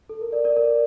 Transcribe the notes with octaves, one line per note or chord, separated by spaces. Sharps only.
A4
A#4
A#4 D5
A#4 D5
A#4 D5